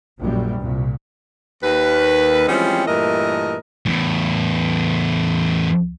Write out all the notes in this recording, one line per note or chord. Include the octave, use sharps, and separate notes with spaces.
A#1 F#2 G3
C2 A#2
D#2 B4
E3 F3 G3 G#3 C4 C#4
G2 A#2 E3 A3 A#4 D#5
E2 A2